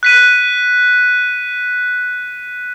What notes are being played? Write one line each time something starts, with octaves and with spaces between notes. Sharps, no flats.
F#6 B6 D#7